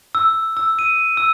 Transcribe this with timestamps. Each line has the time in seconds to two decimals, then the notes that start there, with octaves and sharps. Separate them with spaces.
0.15 E6
0.57 E6
0.79 D#7
1.17 E6